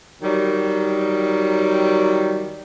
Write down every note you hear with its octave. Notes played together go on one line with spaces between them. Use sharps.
D#3 F#3 G3